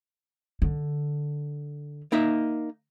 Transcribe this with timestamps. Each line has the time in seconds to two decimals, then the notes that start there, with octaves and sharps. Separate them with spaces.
0.62 D3
2.12 A#3 D#4 E5